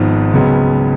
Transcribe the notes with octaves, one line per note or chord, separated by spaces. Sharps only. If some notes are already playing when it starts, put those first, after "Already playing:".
Already playing: G#1 G#2 F3 B3
C#2 C#3 F#3 B3